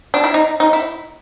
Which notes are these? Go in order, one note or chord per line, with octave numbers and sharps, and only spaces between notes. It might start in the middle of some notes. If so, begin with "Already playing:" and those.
D4
E4
D#4
D#4
E4